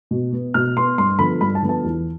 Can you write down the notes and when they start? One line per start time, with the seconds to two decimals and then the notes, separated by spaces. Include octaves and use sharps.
0.11 B2
0.33 B3
0.54 B2 F6
0.76 B3 C6
0.98 G2 C6
1.19 D3 F3 B3 B5
1.41 G2 B5
1.55 A5
1.63 D3 F3 B3
1.69 A5
1.84 E2